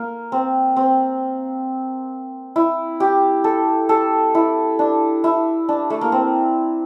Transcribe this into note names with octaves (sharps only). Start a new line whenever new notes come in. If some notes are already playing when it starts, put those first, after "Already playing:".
Already playing: A#3
C4
C4
E4
G4
A4
A4
E4
D4
E4
D4
A3
A#3
C4